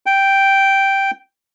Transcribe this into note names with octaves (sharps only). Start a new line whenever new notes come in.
G5